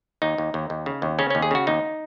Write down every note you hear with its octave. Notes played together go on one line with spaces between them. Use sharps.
D#2 D#4
D#2
D#2
D#2
C#3
D#2
C#3 C#4
D#2 C#4
G#4
C#3 F#4
D#2 D#4